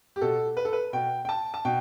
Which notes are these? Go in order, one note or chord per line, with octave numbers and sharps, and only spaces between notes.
G4
B2 A4
B4
A4
B4
B2 G5
G5
A5
A5
B2 G5